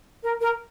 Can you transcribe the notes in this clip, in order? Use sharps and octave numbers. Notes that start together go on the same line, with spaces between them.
A#4
A#4